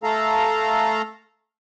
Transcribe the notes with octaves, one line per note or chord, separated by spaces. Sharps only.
A3 A4 F5 A#5